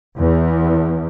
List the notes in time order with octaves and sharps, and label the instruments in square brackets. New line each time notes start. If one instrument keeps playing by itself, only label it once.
[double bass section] E2